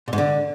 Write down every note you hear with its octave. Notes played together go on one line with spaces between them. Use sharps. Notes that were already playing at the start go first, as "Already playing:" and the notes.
A#2
G#2
D3